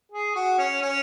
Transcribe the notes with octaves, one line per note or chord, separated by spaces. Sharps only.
G#4
F#4
C#4
C#4